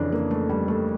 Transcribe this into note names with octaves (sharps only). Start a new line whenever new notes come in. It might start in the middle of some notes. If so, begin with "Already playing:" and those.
Already playing: F2 C#3 E3 C#4 D4
A#3
A3
G3
A3